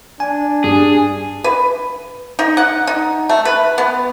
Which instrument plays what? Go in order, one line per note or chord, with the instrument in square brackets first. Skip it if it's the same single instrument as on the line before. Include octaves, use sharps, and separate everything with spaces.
[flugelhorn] D4 [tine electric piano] G#5
[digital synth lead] G2 [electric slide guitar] G#4
[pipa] B4
D#4
F#5
D#4
A3
B4
B3